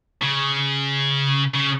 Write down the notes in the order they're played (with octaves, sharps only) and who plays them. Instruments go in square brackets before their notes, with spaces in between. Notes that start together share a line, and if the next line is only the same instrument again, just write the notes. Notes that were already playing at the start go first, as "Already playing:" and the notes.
[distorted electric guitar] C#3
C#3